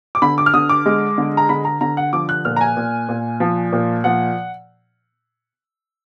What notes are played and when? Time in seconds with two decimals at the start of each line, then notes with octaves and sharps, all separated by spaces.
0.15 D6
0.22 D3 B5
0.38 D6
0.46 F6
0.54 D3 D#6
0.69 D6
0.86 G#3
1.18 D3
1.37 A#5
1.49 D3 B5
1.65 A#5
1.81 D3 A#5
1.97 F#5
2.13 F3 D6
2.29 F#6
2.45 A#2 F6
2.56 A#5
2.61 G#5
2.77 A#2
3.09 A#2
3.40 F3
3.73 A#2
4.04 F3 F#5